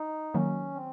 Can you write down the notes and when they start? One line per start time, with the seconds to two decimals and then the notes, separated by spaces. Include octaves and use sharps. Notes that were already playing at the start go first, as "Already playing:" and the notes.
Already playing: D#4
0.34 D#3 F#3 A#3 C#4
0.75 C4